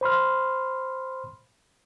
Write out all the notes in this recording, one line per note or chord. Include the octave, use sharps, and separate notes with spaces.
C5 B5 C6 F6